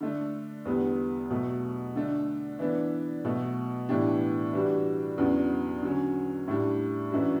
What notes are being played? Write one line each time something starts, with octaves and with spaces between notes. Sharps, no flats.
D3 A3 D4
E2 D3 G3 B3
B2 F#3 A3
D3 A3 D4
E3 B3 D4
B2 F#3 A3
A2 E3 B3 D4 G4
E3 G3 D4 F#4
E2 C#3 F#3 B3 D4
D3 F#3 C#4
A2 G3 D4
F#2 E3 A3 D4 F#4